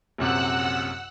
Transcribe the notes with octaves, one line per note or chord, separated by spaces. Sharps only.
A#1 F#2 C3 F#5 E6 F#6